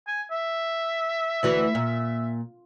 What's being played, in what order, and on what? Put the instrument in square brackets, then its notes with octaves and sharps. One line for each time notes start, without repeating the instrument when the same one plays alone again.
[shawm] G#5
E5
[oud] D2 E3 F#4
A#2